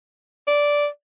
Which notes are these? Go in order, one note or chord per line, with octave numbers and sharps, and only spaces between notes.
D5